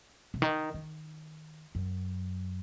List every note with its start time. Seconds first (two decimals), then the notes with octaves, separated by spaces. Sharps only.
0.34 C3
0.42 D#3
0.74 D#3
1.75 F#2